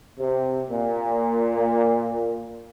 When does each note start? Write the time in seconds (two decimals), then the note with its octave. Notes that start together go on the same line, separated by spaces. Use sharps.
0.18 C3
0.69 A#2